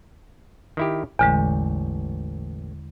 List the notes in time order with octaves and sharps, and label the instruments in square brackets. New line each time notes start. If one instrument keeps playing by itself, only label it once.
[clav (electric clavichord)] D#3 E4 G4
[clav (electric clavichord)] A1 [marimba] E2 D3 G#3